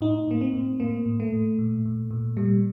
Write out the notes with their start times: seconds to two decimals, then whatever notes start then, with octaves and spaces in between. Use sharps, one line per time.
0.01 A2 D#4
0.28 A2 A#3
0.41 C4
0.53 A2
0.80 A2 A#3
1.06 A2
1.20 A3
1.32 A2
1.59 A#2
1.85 A#2
2.11 A#2
2.37 A#2 G3